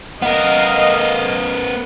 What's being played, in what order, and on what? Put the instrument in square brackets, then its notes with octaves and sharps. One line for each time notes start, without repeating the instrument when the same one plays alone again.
[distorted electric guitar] B3 A#4 [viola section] D#5 F5 [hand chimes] F#5